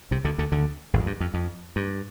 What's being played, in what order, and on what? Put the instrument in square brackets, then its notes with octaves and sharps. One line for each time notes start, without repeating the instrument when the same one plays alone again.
[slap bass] C2 C3
D2 D3
D2 D3
D2 D3
G#1 G#2
F2
G2
F2
F2
G2